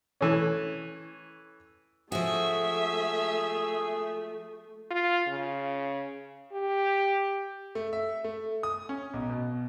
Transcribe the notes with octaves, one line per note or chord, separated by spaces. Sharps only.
E3 A3 C#4
F3 A3 F#4 G#4 E5
F4
C#3
G4
A3
E5
A3
D#6
C#4
B1
B2